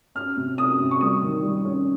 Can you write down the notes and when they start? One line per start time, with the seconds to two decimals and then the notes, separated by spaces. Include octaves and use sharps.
0.15 C#4 F6
0.36 C3
0.58 C#4 D#6
0.79 C3
0.91 C#6
1.01 G3 D#6
1.22 D#3
1.43 G3
1.65 C#4